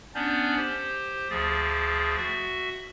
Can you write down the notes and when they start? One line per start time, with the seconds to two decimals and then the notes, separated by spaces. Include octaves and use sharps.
0.15 B3 C#4 D4 D5 G6
0.56 G4 C5
1.30 D2 F3 G#4 A6
2.18 F#4 E5